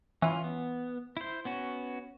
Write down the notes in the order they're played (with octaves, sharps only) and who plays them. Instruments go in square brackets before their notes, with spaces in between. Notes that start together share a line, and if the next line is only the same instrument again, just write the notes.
[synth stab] E3 [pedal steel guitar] C#4 F4
[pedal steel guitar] B3
E4 C5
B3 C#4 F#4